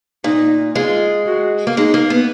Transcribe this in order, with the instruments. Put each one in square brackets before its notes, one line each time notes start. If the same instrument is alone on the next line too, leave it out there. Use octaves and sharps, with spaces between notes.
[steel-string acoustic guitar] A#2 [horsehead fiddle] D#4
[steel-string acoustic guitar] G#3 [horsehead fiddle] F4
[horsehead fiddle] F#4
[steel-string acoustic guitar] A#3
[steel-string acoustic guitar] G#3 [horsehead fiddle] D#4
[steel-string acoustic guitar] A#3
B3